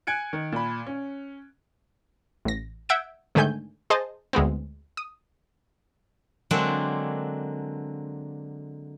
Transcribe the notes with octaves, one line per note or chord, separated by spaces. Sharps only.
G#5 F#6 G#6 C#7 D7
D#3
A#2 B5
C#4
A1 A#6
E5 F#5 E6 G6 G#6 D7
G#2 D3 D#3 A3 G#5 G6
G#4 C5 D#5 A5
D2 G#3 B3 C4
D#6
D3 F#3 G#3 A#3 C4 D4